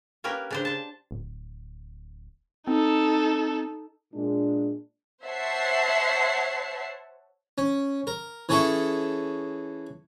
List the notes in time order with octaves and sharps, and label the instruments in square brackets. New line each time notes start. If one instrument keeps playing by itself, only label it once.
[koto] A#3 C#4 G4 A#4 B4
C#3 D4 C5
C5 A5
[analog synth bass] D1
[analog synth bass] C4 [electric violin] D#4 A4
[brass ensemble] A#2 G#3 D4
[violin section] C5 C#5 E5 F#5 A5 C7
[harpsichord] C#4
A#4
E3 C#4 G#4 A4 E5 C#6